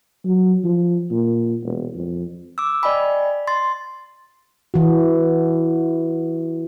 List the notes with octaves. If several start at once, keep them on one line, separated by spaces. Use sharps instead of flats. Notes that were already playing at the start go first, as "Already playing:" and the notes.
F#3
F3
A#2
E1
F2
D6 E6
D5 D#5 G5 G#5 B5
C6 A6
E3 F#4